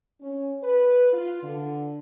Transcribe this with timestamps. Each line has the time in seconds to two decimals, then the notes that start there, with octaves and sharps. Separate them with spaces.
0.22 C#4
0.64 B4
1.13 F4
1.43 D3